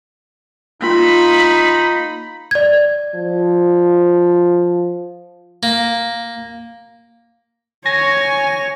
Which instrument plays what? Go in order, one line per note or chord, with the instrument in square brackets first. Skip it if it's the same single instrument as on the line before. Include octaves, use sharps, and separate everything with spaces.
[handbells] A#3 F4 [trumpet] D#4 [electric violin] B5
[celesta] D5 G#6
[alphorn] F3
[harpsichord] A#3
[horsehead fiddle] C#5 [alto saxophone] G#5 [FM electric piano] A#6